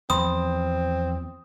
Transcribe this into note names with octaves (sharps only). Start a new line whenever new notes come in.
E2 F3 C4 B5 C6 D#6